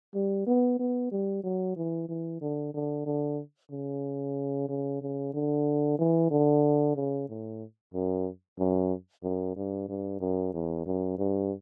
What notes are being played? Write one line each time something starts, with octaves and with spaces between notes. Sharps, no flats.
G3
B3
B3
G3
F#3
E3
E3
D3
D3
D3
C#3
C#3
C#3
D3
E3
D3
C#3
A2
F#2
F#2
F#2
G2
G2
F#2
E2
F#2
G2